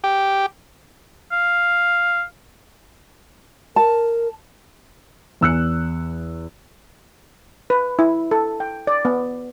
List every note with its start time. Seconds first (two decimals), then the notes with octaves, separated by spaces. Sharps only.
0.04 G4
1.32 F5
3.76 A#4 A5
5.41 E2 E6 F#6 C#7
7.70 B4
7.99 E4
8.31 A4
8.60 G5
8.87 D5
9.05 B3